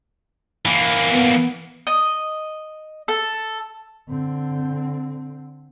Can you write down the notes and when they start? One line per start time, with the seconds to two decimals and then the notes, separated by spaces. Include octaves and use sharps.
0.66 E3 A#3
1.12 B3
1.87 D#5
3.08 A4
4.08 D3 C4